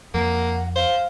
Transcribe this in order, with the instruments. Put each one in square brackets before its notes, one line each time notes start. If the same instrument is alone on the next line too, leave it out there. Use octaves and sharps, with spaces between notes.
[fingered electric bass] F2 [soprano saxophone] A#3 [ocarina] F#5
[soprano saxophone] C5 [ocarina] F5